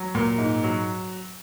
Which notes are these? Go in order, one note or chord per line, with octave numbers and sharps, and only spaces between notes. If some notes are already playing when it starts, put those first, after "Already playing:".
Already playing: F#3
A#2
G#2
F#3